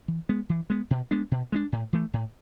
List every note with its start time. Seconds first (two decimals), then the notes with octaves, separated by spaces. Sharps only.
0.08 E3
0.29 G#3 B3
0.49 E3
0.70 G#3 B3
0.90 B2
1.11 G#3 B3 D4
1.31 B2
1.52 G#3 B3 D4
1.72 A2
1.93 E3 A3
2.13 A2